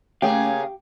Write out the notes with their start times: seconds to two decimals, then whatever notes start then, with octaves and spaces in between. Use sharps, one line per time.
0.22 C#3 A3 A#3 C#4 G4 G#4 F5